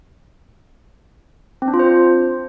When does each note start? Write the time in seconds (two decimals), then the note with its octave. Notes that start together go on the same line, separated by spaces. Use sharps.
1.62 C4
1.68 D4
1.74 F4
1.79 C5